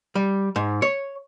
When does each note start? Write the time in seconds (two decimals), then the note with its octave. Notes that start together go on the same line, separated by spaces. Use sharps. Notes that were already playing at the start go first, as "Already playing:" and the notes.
0.15 G3
0.56 G#2
0.82 C#5